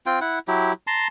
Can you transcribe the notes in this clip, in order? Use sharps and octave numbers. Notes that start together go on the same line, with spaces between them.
C4 F4 G5
E4 F#5
F#3 E4 G4
A5 A#5 C6